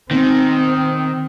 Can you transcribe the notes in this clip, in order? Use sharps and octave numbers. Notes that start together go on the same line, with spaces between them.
D#3 C4